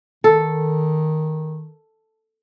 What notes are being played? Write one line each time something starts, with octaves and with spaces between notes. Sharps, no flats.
D#3 A4